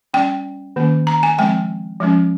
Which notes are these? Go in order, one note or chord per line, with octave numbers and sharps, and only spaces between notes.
G3 C#4 G5
D#3 A#3 C#4
A#5
G#5
F3 G#3 C4 G5
F3 G#3 C#4